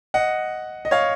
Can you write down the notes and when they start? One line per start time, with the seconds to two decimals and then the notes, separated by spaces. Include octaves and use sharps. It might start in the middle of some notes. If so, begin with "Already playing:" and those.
0.14 D#5 F#5
0.85 D#5
0.91 C#5 F5